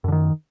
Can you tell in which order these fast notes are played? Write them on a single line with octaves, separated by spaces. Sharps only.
F#2 D3 D#3